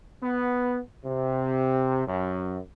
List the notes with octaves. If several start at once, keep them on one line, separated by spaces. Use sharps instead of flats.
B3
C3
F#2